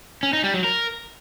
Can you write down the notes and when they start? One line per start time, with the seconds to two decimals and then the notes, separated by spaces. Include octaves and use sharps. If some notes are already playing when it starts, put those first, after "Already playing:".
0.23 C#4
0.33 D#4
0.44 G3
0.54 F#3
0.64 A#4